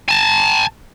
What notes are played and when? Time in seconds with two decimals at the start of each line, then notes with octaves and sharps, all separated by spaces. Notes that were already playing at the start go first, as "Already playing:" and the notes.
0.09 G#5 A5